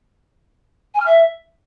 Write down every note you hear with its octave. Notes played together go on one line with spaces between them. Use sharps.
G#5
F6
E5